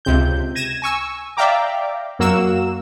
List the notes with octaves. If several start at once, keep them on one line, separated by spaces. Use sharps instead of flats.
C#2 C3 G6
G#6 A#6 D#7 E7
G#5 C#6 E6
D5 E5 F5 G5 A#5 D6
F#2 A#3 F#4 E6 E7